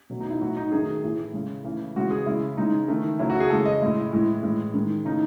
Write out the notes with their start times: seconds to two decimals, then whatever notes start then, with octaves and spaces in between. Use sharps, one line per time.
0.10 B2 F#3 A3
0.20 D#4
0.30 E4
0.40 A2 F#3 A3 F#4
0.57 D#4
0.72 D#3 F#3 A3 G#4
1.03 A2 E3 A3
1.33 C#3 E3 G#3
1.64 C#3 E3 A3
1.96 C#3 E3 G#3 F#4
2.11 G#4
2.26 C#3 G#3 E4
2.57 C#3 E3 G#3 D#4
2.88 D#3 A3
3.19 C#3 F#3 A3 E4
3.30 F#4
3.40 G#4
3.50 C#3 E3 G#3 A4
3.65 D#5
3.81 A2 G#3 E4
4.13 A2 E3 G#3
4.43 A2 E3 G#3
4.74 D#3 G#3
5.05 C#3 E3 A3 D#4